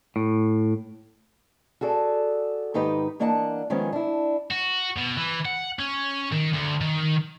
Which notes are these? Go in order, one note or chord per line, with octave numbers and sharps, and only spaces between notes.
A2
F#4 G#4 A4 D5
G#2 D#3 D#4 G4 B4 D#5
E3 A#3 D4 D#5 F#5 A5
D#3 F3 G#3 B3 C#4
D4 E4
F#4
B2
E3
F#5
C#4
D#3
D2
D#3